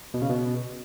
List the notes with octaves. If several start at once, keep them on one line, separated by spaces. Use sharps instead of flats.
B2
C#3
B2